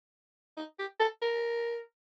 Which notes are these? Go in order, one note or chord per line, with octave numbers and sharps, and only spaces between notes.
D#4
G4
A4
A#4